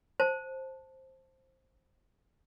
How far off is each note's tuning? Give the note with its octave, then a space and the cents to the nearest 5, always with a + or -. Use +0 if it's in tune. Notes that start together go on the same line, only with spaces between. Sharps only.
C5 +10 A5 +0